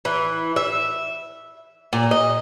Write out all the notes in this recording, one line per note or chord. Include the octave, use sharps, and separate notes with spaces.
E3
E5
A#2
D#5